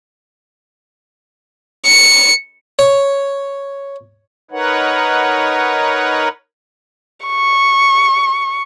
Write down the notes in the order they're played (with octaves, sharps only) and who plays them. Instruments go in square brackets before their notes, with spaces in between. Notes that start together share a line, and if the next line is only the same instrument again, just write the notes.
[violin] C#7
[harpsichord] C#5
[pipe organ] D#4 A#4 B4 C#5 F#5
[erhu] C#6